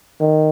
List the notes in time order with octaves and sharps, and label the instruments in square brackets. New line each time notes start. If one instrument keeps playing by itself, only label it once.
[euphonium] D#3